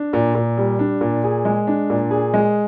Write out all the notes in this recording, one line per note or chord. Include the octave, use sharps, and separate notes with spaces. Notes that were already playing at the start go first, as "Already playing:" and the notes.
Already playing: D4
A#2
A#2
G3
D4
A#2
G#4
G#3
D4
A#2
G#4
G#3